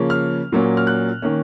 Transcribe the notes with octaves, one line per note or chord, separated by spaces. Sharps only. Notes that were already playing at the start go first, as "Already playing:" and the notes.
Already playing: C#3 F3 A#3 C#4
F6
A#2 F#3 A#3 C#4
F6
F#6
D#3 A#3 C#4